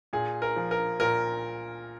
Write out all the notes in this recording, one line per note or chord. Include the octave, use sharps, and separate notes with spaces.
A#2 G#4
A#4
F3
A#4
A#2 A#4